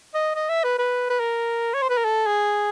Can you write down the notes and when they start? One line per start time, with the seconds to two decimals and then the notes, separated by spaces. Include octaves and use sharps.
0.14 D#5
0.36 D#5
0.49 E5
0.64 B4
0.78 B4
1.10 B4
1.20 A#4
1.74 C#5
1.82 C5
1.89 B4
1.97 A#4
2.04 A4
2.26 G#4